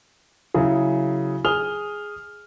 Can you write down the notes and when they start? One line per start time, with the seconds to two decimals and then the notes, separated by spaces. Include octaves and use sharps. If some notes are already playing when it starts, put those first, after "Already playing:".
0.54 C#3 F#3 E4 G#4
1.45 G#4 D#6 F6 F7 G7